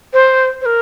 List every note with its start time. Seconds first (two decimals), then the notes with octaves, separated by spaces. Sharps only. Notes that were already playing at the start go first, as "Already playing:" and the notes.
0.13 C5
0.61 C5
0.66 A#4